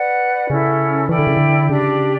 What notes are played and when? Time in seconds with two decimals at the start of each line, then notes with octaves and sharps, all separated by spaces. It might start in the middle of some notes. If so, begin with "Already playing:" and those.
Already playing: B4 D5 F#5
0.50 C#3 C#4 E4 A4
1.09 E3 E4 A4 D5 G5
1.19 D3
1.27 C#3
1.37 D3
1.70 C#3 D4 G4 D5